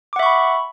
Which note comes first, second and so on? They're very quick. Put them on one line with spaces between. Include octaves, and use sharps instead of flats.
D6 F#5 E5 C#6 B5